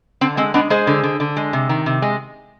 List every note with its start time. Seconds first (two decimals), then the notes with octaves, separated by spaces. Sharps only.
0.21 D3 C4
0.37 G#3 C4
0.54 G#3 B3 D4
0.70 G#3 G#4 C5
0.87 D3
1.03 D3
1.20 D3
1.37 G#3
1.53 C3
1.69 D#3
1.86 C3
2.02 G#3